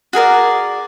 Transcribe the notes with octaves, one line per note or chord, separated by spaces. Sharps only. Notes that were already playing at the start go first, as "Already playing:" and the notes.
F#4 G#4 A#4 D5